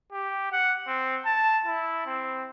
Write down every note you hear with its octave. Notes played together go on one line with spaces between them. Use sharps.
G4
F#5
C4
A5
E4
C4